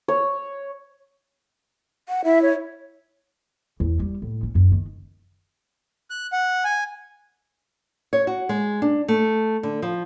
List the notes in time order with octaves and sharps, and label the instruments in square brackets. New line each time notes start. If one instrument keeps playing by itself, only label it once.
[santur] C#5
[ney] F#5
[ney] E4 [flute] E5
[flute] C#5
[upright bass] E2
G3
A2
C#4
F#2
D#3
[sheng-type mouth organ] F#6
F#5
G#5
[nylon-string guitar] C#5
F#4
G#3
D4
A3
D3
F3